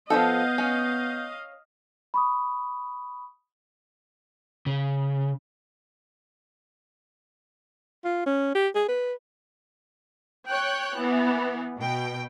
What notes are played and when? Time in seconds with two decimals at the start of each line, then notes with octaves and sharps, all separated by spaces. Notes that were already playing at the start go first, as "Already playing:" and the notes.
0.10 F3 G#3 B3 A4 D#5 F5 G6
0.58 C#4
2.14 B5 C#6 D#6
4.66 C#3
8.05 F4
8.26 C#4
8.55 G4
8.75 G#4
8.88 B4
10.49 C#5 G5 F#6
10.98 E3 B3
11.78 B2 G5